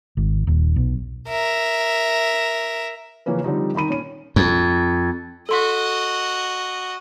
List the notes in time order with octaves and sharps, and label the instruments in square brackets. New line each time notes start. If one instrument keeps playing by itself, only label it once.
[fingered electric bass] G#1
D#1
B1
[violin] A#4 E5
[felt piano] C#3 E3 F3 A#3 C#4 B4
D3 F3 G3 C4 D#4
D#3 D#4 B5 D#7
A#2 C#4 D#7
[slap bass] F2
[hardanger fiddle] F#4 D#5 [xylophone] A4 C6 B6